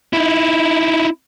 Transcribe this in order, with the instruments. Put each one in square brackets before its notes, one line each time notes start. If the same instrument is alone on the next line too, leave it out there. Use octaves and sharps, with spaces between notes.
[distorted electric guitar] D#4 E4